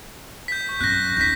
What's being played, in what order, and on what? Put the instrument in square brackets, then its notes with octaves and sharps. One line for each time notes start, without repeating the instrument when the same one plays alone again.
[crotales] G6 B6
C#6
[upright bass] F#2 C#4 [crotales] F#6 A#6
[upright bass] D#2 C#4 [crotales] G6 B6